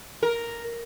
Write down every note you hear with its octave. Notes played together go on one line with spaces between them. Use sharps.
A#4